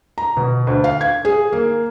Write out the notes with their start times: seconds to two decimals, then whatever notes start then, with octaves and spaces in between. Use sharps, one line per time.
0.18 A#5
0.37 B2
0.67 D2
0.84 F5
1.01 G#6
1.25 G#4
1.52 A#3